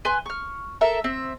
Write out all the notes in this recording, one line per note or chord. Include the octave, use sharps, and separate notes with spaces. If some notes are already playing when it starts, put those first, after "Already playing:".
B4 G#5 C6
C#6 F6
A4 A#4 E5
C4 E5